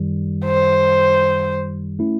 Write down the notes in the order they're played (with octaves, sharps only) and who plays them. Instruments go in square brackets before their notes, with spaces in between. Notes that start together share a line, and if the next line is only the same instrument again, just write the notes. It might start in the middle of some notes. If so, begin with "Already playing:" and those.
Already playing: [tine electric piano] F#2 D#3 G3
[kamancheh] C5
[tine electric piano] A3 C#4 E4